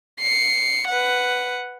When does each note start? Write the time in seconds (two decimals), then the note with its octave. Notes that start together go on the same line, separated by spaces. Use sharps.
0.20 C7 C#7
0.88 B4 F#5